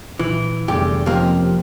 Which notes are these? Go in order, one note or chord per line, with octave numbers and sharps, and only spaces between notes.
A#2 E3
F1 E2 A2 D3 G3 G4
F2 A#3 C4 C#4 G4